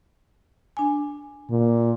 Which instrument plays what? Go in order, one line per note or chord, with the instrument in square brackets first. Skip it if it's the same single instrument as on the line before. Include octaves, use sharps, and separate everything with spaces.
[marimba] D4 G#5
[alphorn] A#2